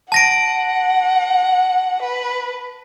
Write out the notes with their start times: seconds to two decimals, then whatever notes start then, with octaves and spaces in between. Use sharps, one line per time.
0.12 F#5 A5 A#6 D7
2.02 B4